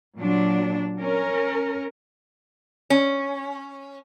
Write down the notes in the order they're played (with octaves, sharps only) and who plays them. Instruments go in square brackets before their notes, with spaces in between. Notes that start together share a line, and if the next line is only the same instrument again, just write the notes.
[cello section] A#2 F#3 D4
C#4 A#4
[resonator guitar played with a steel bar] C#4